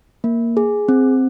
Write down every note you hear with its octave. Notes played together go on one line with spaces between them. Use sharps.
A#3
G#4
C4